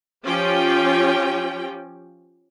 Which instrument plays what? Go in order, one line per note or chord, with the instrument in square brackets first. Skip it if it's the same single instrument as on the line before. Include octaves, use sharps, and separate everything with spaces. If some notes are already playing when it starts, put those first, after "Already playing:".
[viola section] F3 C#4 F4 G4 G5